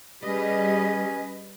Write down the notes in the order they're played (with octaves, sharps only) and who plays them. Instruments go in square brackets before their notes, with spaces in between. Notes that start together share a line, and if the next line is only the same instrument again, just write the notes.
[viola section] G3 G#4 [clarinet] C#4 [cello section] B4 D#5